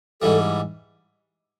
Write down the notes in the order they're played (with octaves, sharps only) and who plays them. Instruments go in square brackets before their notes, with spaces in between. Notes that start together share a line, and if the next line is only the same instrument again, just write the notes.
[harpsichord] G#2 E3 G3 [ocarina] A4